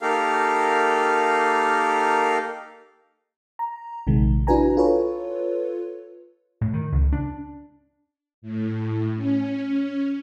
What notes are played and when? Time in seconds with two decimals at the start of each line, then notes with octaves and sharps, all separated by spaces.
0.01 A#3 D#4 G4 A4 A#4 F5
3.59 A#5
4.07 A#1 C3 D#3 G#3
4.47 D4 E4 F#4 B4 G#5 A#5
4.77 F4 A4 B4 C#5
6.61 A2
6.74 D#3
6.92 C#2
7.12 D4
8.42 A2
9.16 C#4